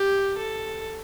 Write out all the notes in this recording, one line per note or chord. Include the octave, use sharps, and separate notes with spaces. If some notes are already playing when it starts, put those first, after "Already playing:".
Already playing: G4
A4